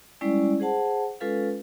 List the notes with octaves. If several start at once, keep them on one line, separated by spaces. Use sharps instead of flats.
G3 G#3 C#4 E4 D5
G#4 C5 F#5 A5
G#3 C#4 F4 A4 B4 F5